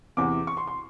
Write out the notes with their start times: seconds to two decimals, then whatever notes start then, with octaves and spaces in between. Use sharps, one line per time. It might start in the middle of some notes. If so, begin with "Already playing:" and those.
0.17 E2 C3 E3 D6
0.47 C#6
0.57 C6
0.67 C6